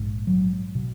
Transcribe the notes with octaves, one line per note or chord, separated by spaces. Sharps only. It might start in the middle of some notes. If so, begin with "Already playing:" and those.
Already playing: A#1 G#2
F#3
B2